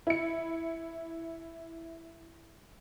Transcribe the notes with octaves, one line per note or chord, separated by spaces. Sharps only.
E4 C#7